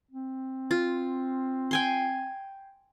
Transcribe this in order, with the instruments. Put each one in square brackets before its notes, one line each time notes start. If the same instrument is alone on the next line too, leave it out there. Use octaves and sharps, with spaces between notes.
[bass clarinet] C4
[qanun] F4
G5 G#5 C6